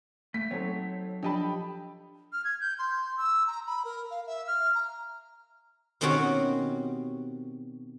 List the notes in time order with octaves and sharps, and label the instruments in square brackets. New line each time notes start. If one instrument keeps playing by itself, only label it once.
[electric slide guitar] A3 [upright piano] B6
[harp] F#3 D#4 [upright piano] C4 A4 [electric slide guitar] C#5
[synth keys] F3 D4 [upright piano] G4 G5 B5 [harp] A4 D#5 A5
[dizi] F6
G#6
G6
C6
E6
A#5
B5
A#4
F5
E5
F6
A#5
[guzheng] B2 D#3 C4 C#4 F#4 G4